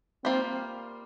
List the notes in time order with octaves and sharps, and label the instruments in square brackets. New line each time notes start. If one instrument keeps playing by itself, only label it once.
[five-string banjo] G3 A#3 F4 [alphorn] C4